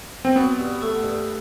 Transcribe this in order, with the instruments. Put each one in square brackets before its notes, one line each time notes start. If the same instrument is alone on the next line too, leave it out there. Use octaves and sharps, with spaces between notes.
[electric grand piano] C4
[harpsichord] F#3 [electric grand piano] B3
[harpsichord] G2
A3
G2